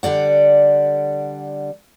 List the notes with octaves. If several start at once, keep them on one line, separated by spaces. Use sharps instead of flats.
D3 G3 D5 F#5